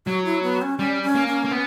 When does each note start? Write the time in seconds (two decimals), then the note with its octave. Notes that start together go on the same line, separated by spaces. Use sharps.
0.07 F#3 F#4
0.25 E4
0.43 B3
0.62 C#4
0.78 G3 C#4
1.03 C#4
1.15 A#3
1.27 C#4
1.45 A#3
1.51 B3